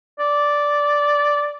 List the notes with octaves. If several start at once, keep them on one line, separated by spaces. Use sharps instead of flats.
D5